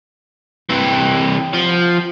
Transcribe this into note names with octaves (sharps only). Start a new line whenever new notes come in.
C3 E3 C4 G4 C#5
F3 F#4 B5